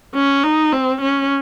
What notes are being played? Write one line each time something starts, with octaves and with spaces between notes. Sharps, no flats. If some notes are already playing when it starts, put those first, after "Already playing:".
C#4
D#4
C4
C#4